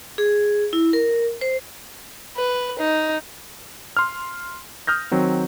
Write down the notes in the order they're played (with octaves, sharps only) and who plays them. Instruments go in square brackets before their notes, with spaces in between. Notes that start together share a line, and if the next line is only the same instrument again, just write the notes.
[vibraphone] G#4
E4
A#4
C5
[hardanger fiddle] B4
D#4
[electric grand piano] C6 F6
D#6 F6 G6 A#6
D#3 F#3 C4